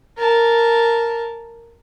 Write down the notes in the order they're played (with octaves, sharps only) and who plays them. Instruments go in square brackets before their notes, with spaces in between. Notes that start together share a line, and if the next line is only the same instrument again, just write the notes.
[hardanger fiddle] A#4 A5